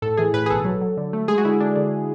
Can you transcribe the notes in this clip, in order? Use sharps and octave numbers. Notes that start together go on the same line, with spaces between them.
A2 A4
E3 G#4
A2 B4
G#4
B1 A4
F#3
F#3
D3
A3
G#3 G#4
F#4
D3 E4
D3 D4
D3 D4